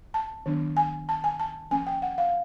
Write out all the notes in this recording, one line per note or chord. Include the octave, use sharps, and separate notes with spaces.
A5
D#3 F#3 B3 D4
G#5
A5
G#5
A5
F3 A#3 C#4 G#5
G5
F#5
F5